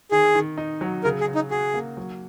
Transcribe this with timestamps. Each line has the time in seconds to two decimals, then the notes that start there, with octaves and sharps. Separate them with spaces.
0.11 D#3 G#4
0.35 D#3
0.58 D#4
0.81 F#3
1.04 C#3 A#4
1.20 G#4
1.28 C#3
1.35 D#4
1.51 F#4 G#4
1.74 A#3
1.97 F#3